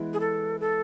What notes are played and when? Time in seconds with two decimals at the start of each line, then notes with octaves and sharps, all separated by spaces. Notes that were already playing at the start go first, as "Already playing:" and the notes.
Already playing: E3 G#3 B3 E4
0.13 G#4
0.20 A4
0.60 A4